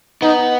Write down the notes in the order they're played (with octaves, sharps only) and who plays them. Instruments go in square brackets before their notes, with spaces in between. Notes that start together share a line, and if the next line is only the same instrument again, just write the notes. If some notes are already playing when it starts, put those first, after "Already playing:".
[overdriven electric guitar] B3 [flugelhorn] D#4